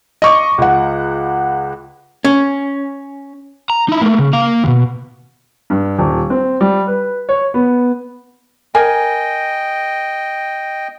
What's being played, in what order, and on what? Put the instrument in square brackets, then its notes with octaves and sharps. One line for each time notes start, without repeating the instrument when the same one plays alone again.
[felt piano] D#5 C#6 D6
C#2 F#5
[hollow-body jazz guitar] C#4
[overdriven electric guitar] A#5
D#4 E4
A3 A#3
C#3
A#3 F5
D#2 B2
[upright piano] G2
D#1
C4
G3
B4
C#5
B3
[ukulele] A#4 G#5 [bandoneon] D#5 G5